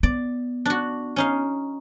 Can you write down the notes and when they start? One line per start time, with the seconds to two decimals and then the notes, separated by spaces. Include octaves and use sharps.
0.03 B3 D5
0.66 D4 F#4
1.16 C#4 D#4 F5